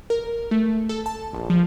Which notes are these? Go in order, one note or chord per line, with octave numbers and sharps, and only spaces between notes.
A#4
A3
A4
A5
A#1
F3